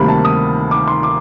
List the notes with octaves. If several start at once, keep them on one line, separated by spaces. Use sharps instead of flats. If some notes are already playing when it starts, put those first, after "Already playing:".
Already playing: D2 C3 D#3 G3 A#3 B5
A5
D#6
D6
C6
D6